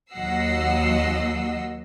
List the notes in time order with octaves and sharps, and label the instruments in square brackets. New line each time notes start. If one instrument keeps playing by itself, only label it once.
[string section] D#2 F#3 D#5 F#5 E6 C7